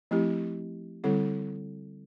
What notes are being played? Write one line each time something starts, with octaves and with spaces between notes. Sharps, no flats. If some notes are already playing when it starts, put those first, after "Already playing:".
F3 A3 C4 E4 G4
D3 G3 C4 E4 A4